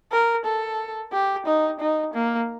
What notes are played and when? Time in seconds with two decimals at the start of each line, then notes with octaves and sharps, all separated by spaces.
0.12 A#4
0.45 A4
1.13 G4
1.46 D#4
1.80 D#4
2.14 A#3